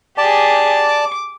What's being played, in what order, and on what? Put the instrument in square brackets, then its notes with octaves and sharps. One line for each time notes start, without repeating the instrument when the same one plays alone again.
[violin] G4 G#4 [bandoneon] D5 A5
[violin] D6